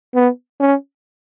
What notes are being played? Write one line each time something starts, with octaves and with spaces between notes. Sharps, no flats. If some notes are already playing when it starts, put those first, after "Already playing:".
B3
C#4